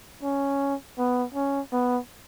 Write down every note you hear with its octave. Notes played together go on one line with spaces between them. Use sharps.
C#4
B3
C#4
B3